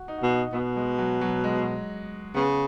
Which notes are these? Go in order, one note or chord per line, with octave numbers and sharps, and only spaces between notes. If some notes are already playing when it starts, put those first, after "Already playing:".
Already playing: F#4
D#4
B2 F#4
D#4
B2 B3
G#3
F#3
F#3
G#3
C#3 B3